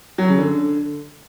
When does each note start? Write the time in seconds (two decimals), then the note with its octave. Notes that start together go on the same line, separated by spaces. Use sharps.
0.18 F#3
0.28 C#3
0.38 D3